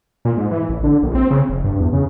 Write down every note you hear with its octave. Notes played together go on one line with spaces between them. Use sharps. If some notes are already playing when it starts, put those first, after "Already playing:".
A#2
G#2
E3
A1
D3
A#1
C4
C#3
F1
G2
E2
C#3